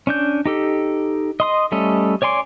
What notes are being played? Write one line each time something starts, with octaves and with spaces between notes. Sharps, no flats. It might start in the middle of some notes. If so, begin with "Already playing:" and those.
C#4 D4 G6
D#4 G4 A4
D#5 C6 D#6
G3 A3 C#4 A4 D#5
C#5 D5 G#5 C6 D6